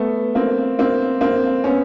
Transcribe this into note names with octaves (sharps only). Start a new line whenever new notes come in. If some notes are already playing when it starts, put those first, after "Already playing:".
Already playing: A3 B3
A#3 C4
A#3 C4
A#3 C4
B3 C#4